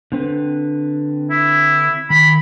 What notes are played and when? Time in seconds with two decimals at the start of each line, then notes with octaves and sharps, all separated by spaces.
0.12 D3 C4 B4
1.30 E4
2.10 D#3 B5